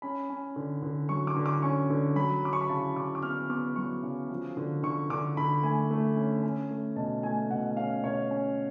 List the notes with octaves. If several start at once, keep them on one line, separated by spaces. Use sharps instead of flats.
C#4 B5
C#4
D3
D3
F#3 C#6
D6
D3
D6
C#4 C#6
D3
F#3 B5
F#3 D6
C#6
B5
C#3 A5
C#3 D6
D6
B3 F6
B3 D6
F#3 C#6
C#3
F3
D3
D3 C#6
D3 D6
D3 B5
A3 G#5
A3
C#4
C#4
A3
B2 A5
A3 G#5
B2 F#5
C#4 F5
B2 C#5
C#4